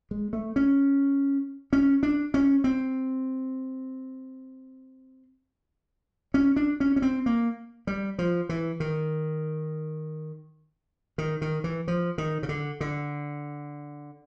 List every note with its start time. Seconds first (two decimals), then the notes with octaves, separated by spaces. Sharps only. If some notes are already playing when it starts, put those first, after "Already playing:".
0.11 G#3
0.33 A3
0.56 C#4
1.73 C#4
2.03 D4
2.34 C#4
2.64 C4
6.34 C#4
6.56 D4
6.80 C#4
6.96 C#4
7.02 C4
7.26 A#3
7.87 G3
8.19 F3
8.49 E3
8.80 D#3
11.18 D#3
11.41 D#3
11.64 E3
11.88 F3
12.18 D#3
12.43 C#3
12.49 D3
12.81 D3